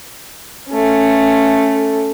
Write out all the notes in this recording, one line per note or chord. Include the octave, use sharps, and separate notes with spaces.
A3 C#4